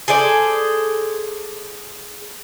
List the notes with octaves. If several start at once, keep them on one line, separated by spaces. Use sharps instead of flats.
G#4 A4 C5 D5